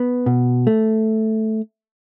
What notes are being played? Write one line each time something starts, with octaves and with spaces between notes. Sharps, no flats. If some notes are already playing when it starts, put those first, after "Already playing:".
Already playing: B3
B2
A3